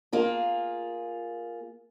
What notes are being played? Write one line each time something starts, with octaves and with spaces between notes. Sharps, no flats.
A#3 F4 G#4